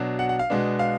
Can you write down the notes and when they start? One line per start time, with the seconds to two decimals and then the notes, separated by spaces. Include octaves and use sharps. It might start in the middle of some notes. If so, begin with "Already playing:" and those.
Already playing: B2 F#3 D4
0.19 F#5
0.29 F#5
0.39 F5
0.50 B2 G#3 B3 D4
0.79 F5